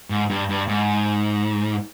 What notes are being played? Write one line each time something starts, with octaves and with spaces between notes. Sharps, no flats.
G#2
G2
G2
G#2